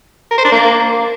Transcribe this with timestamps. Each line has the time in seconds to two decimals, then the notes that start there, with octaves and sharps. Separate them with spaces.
0.31 A#4
0.38 C5
0.45 D4
0.52 A#3